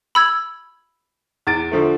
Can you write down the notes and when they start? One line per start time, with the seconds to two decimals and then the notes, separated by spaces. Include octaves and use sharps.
0.15 B5 E6 G#6
1.47 E2 A6 D7
1.71 D3 F3 A3